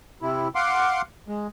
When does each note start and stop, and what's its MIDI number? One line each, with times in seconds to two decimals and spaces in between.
0.22 0.48 48
0.22 0.48 64
0.55 1.01 77
0.55 1.01 78
0.55 1.01 84
0.55 1.01 86
1.28 1.47 56